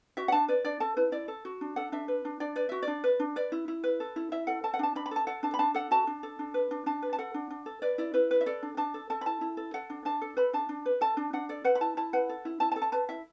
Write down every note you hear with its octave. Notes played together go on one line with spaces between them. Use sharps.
F#4 E5
F#5
D4 A5
B4 D5
D4 D5
A4 A5
E4 B4
E4 D5
A4
F#4
D4
A4 F#5
D4 E5
B4
D4
D4 D5
B4 D5
F#4 E5
D4 D5
B4
D4
B4 D5
E4
E4
B4
A4
E4
E4 E5
A4 F#5
A4 A5
F#5
D4 A5
D4 B5
B5
A4 A5
A4 F#5
D4 A5
B5
D4 A5
A4 F#5
F#4 A5
D4
A4
D4
B4
D4
D4 A5
B4
A5
A4 F#5
D4
D4
A4
B4 D5
E4 D5
E4 B4
B4
E5
A4 D5
D4
D4 A5
A4
A4 A5
B5
E4 A5
E4
A4
A4 F#5
D4
D4 A5
A4
B4 B5
D4 A5
D4
B4
A4 A5
D4
D4 F#5
A4 D5
B4 F#5
B5
E4 A5
E4 A5
B4 F#5
A4
E4
E4 A5
A5
A4
A5
B4 A5
E4 E5